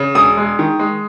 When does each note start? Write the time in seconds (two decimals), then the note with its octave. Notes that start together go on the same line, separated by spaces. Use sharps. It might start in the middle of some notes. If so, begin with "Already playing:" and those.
Already playing: C#3
0.15 E1 D#6
0.37 G#3
0.59 D#3
0.79 G#3